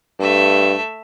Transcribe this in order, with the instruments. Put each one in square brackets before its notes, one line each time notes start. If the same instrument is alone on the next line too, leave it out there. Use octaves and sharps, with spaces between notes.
[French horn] G2 [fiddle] A3 E5